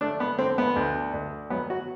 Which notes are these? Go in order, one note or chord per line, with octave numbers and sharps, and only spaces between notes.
A3 D4
B3
D3 C4
B3
D2
D2
F#3 B3
F#4